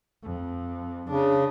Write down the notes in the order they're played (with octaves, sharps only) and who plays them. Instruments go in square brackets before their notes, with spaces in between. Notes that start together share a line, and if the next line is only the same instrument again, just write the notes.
[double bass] F2
[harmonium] C#3 [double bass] D4